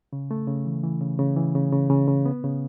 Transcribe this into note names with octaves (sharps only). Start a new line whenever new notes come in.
C#3
A3
C#3
E3
E3
C#3
C#3
E3
C#3
C#3
C#3
C#3
B3
C#3